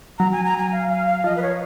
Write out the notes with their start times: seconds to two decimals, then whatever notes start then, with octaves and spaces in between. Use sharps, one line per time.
0.19 F#3 A#5
0.32 G#5
0.45 A#5
0.58 G#5
0.72 F5
0.90 F5
1.07 F5
1.24 F3 D#5
1.36 B4
1.42 C#5